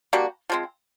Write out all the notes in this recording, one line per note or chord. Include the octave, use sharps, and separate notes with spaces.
G3 A#3 D4 F#4
F3 G#3 C4